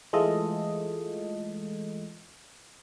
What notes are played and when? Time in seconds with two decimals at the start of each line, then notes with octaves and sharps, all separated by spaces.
0.13 E3 G#3 A3 F4 A4 D#5